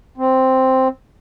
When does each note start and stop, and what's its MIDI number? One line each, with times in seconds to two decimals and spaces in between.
0.18 0.88 60